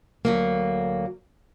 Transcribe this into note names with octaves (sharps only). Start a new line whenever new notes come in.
D2 F#3 A#3